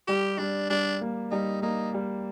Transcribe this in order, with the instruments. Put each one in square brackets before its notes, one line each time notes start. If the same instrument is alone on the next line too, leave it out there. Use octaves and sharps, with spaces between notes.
[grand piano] G3 [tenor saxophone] G4
[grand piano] G3 [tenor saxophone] D4
[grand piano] G3 [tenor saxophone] D4
[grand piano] A#3
[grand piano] G3 [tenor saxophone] D#4
[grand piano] A#3 [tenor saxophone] D#4
[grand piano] G3